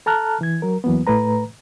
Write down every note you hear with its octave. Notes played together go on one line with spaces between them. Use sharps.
A4 A5 A#5 F6 F#6
E3 G#6
F#3 A#4
E2 E3 F#3 A#3 B3
A2 A3 B4 A#5